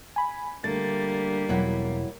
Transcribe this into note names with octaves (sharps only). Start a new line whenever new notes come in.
G#5 B5
D3 G3 A3 A#3 A6
E1 B2 F#3 E4 F#5